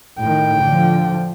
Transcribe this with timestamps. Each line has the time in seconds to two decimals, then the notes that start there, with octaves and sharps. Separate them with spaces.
0.20 A2 D#3 G5
0.63 D3 F3